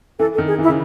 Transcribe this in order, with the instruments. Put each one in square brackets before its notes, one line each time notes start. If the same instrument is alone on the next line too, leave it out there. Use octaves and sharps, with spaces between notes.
[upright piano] E3 [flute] A4
[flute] A4
[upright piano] D#3
[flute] G#4
[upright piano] E3
[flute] E4
[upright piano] C#3